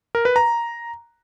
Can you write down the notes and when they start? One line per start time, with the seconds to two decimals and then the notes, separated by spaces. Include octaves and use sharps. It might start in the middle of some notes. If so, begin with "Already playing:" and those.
0.15 A#4
0.25 B4
0.36 A#5